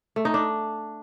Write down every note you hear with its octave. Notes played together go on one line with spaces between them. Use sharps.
A3
D#4
D4